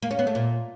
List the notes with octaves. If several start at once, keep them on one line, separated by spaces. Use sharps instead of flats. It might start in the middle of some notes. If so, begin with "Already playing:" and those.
A#3
C#4
B3
A3
A#2